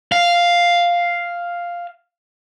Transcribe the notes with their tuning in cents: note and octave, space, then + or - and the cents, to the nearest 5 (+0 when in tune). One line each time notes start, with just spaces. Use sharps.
F5 +0